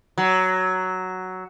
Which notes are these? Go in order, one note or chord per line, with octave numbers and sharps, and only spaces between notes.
F#3